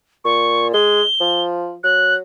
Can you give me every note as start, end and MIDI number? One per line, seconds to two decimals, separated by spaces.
0.25 0.70 46
0.25 0.68 85
0.74 1.02 56
0.74 1.42 103
1.21 1.76 53
1.84 2.21 54
1.84 2.14 90